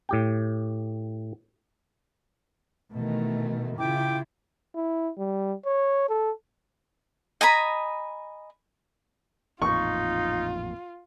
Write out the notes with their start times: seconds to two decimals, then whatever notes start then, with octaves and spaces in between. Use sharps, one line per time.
0.09 A2 G4 G5
2.92 B2 D#3 E3 A3
3.78 C#3 E4 F4 G5 D6
4.75 E4
5.18 G3
5.66 C#5
6.09 A4
7.41 D#5 G#5 A#5 B5
9.62 A1 F2 A#2 D#4 F4 C#6